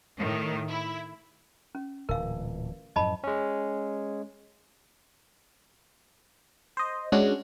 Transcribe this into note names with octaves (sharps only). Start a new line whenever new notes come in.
A2 D#3
E4
C#4
D1 A#2 E3 A#4 F5
F#2 A2 F3 D#5 A5 B5
G#3 C#4
C5 D#5
G#3 C#4 D4 F#4